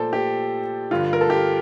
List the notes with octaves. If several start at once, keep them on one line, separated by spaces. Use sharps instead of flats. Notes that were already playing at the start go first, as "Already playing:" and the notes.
Already playing: A#2 F3 A4 C5 D5
G4
G2 D3 F3 F4
A#4
A4
G4